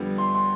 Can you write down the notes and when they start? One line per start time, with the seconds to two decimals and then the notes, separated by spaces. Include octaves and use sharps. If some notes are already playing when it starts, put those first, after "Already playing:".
Already playing: F2 D3 G3 B3
0.18 C6
0.35 C6